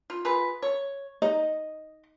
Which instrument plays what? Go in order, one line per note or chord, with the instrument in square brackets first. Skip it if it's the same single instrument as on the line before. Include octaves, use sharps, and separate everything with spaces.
[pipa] F4
F4 G#4 B4
C#5
[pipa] D#4 [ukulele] D#5